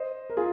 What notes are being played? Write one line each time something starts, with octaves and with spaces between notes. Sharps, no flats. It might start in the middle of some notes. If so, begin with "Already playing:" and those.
Already playing: C5 D#5
A#4
F4 G#4